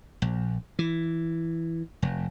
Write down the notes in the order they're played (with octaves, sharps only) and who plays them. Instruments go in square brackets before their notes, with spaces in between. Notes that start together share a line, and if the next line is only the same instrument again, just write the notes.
[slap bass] A#1
E3
F1